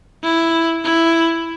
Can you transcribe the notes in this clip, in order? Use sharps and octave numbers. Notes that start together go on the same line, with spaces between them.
E4
E4